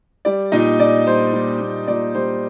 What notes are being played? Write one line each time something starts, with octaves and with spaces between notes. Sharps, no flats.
G3 D5
A#2 D#4 D#5
A#2 D5
G3 C5
G3
A#2
A#2 D5
G3 C5